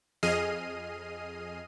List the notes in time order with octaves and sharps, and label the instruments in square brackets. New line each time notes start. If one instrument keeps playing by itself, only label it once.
[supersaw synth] F2 G#4 D#5 F6 C7 D#7